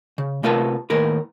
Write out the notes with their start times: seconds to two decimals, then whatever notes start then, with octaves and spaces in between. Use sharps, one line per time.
0.18 C#3
0.43 C3 A3 F4 A#4 B4 A5
0.90 D#2 A2 A#4 B4